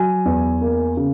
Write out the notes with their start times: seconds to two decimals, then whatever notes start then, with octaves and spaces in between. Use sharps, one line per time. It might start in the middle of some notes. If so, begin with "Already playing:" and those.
Already playing: F#3 G#5
0.25 E2
0.61 A#3
0.97 C#3